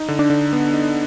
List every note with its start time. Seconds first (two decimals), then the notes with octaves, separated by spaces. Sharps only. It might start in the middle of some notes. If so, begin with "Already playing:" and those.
Already playing: D#4
0.08 D3
0.19 D4
0.30 D3
0.53 B3
0.74 D#4